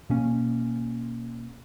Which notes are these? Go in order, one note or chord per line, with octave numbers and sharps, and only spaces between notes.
B2 A#3 C#4